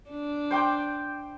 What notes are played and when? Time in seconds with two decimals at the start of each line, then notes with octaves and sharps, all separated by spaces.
0.10 D4
0.51 C5 G5 D6